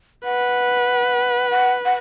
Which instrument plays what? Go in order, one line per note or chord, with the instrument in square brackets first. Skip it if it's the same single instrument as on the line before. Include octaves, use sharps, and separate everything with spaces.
[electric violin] B4 [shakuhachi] F#5
[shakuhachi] F#5
F#5